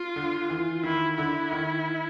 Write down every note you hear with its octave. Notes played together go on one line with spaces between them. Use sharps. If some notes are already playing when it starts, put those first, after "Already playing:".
Already playing: F4
D3
E3
D#3 E4
D3 E4
D#3